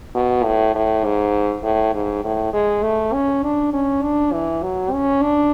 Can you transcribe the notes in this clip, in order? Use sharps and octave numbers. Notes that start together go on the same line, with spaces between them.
B2
A2
A2
G#2
A2
G#2
A2
G#3
A3
C#4
D4
C#4
D4
E3
F#3
C#4
D4